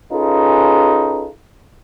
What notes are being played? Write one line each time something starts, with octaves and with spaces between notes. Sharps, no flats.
C#4 D#4 F4 G#4 A4 B4